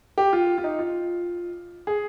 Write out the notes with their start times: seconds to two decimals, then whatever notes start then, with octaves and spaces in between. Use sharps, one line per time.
0.18 G4
0.33 F4
0.58 F4
0.64 D#4
0.79 F4
1.87 G#4